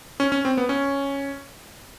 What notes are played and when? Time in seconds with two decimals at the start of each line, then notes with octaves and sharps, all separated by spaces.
0.20 C#4
0.32 C#4
0.45 C4
0.58 B3
0.69 C#4